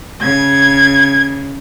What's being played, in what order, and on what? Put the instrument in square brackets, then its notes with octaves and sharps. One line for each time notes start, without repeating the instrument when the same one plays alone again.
[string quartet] C#3 [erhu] G#6